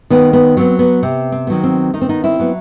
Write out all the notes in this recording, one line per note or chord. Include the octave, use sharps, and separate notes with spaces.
D#3 B3
B3
F#3 B3 C4
B3
C3 C4
C4
D#3 F#3 B3
C4
D#3 D#4
C4
B3 D#4
C4 E4
F#3 B3